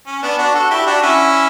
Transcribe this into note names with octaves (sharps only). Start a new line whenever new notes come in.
C#4
B3 D4
D4 F#4
F#4 A4
E4 G4
D4 F#4
C#4 E4